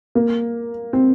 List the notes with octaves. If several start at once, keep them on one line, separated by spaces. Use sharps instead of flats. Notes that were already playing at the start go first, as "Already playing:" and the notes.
A#3
C4